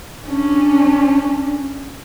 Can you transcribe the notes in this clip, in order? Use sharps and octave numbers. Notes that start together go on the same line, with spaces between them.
C#4 D4